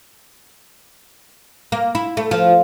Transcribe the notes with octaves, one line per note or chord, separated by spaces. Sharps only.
A#3
E4
A3
F3